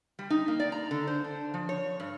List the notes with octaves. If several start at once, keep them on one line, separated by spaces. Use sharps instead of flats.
G3
D#4
A#3
D5
A#5
D3
C5
D4
F3
C#5
G2